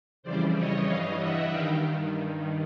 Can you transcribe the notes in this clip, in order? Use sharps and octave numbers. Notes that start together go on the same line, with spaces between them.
F2 C#3 E3 G3 C5 D5
C#5 D#5
G2 E3 G3 D#5 F5
E5 F#5
G2 D#3 F5 G5